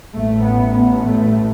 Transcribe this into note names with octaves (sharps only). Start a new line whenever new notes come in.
A1 A2 A3
B3
B3
A3